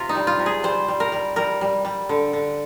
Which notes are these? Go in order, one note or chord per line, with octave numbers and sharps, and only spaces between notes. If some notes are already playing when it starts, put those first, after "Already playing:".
Already playing: C3 F4
D#4
G3
F4
C3
G#4
G3 C5
G3
A#4
G3
G3 A#4
G3
G3
D3
D3